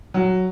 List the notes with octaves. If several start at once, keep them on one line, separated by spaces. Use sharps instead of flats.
F#3